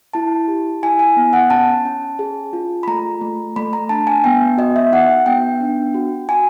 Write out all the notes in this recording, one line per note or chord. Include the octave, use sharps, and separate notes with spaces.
E4 A5
G4
E4 G#5
G#5
B3
F#5
C#4 A5
C#4
G#4
F4
B5
A3 A#5
A3
A3 B5
A#5
D4 A5
G#5
B3 G5
F#4 D#5
E5
D#4 F#5
B3 G5
D4
F#4
F#4 G#5